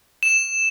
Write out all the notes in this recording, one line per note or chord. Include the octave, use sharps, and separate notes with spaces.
E7